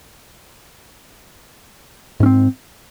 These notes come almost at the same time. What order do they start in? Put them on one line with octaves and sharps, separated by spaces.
G#2 C#4 C4